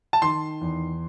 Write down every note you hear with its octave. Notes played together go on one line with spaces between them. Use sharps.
A5
D#3 C6
E2